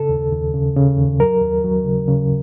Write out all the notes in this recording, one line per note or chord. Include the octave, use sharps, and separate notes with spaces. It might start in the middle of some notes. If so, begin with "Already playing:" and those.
Already playing: C#3 A4
D#2
D#2
C#3
C#3
D#2
F#3 A#4
D#2
F#3
C#3
C#3